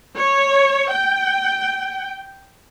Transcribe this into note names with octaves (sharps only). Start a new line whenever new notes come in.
C#5
G5